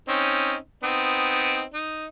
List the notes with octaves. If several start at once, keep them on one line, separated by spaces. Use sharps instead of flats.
C4 C#4 D#4
B3 C4 D#4
D#4